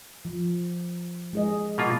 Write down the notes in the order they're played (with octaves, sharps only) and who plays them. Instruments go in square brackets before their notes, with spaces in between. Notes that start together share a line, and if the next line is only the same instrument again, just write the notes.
[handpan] F3
G#3 G#4 D#5
[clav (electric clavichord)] B2 A#3 F4